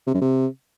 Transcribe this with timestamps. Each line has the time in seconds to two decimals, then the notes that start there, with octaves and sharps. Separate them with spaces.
0.07 C3
0.14 F#2
0.22 C3